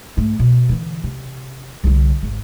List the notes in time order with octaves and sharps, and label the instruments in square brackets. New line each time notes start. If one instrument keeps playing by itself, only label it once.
[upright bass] G#2 A3
B2
D3 E3
C3
C2 D3
G#1